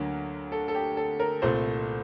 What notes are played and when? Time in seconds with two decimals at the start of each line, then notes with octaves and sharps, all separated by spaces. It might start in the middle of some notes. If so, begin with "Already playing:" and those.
Already playing: D2 D3 F#3 A#3
0.52 A4
0.68 A4
0.75 G4
0.97 A4
1.20 A#4
1.42 C2 A#2 A3 C5